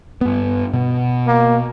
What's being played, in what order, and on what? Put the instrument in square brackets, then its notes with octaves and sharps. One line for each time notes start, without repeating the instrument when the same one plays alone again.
[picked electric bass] G2 B3
B2
[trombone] A#3